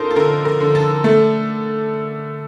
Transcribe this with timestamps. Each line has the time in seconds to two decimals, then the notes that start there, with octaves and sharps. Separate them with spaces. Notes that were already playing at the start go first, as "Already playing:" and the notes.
Already playing: F3 D#4 A4 A#4 C5
0.11 A4
0.16 D3 A#4
0.45 A#4
0.60 D3
0.75 A4
1.04 A3 A4